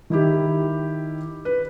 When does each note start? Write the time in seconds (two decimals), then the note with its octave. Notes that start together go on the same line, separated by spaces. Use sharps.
0.10 D#3 E4 G4
1.45 B4